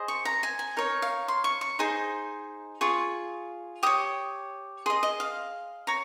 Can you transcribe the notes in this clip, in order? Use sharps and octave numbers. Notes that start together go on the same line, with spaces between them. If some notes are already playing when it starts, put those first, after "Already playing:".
Already playing: G#4 C5 D#5
C#6
A#5
G#5
G#5
D#4 A#4 C#5
F5
C6
C#6
C#6
D#4 G#4 C5 C6
F4 G#4 C#6
G4 C#5 D#6
G#4 D#5 C6
D#5
F5
C#5 A#5